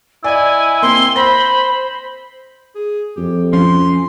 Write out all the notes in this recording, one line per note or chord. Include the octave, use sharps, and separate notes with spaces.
E4 D5 D#5 G#5
A#3 C4 C6 G7
C5 B5 A#6
G#4
F2 G4
F3 C#4 C6